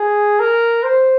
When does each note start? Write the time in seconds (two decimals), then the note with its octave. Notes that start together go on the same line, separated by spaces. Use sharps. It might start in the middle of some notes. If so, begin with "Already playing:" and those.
Already playing: G#4
0.39 A#4
0.83 C5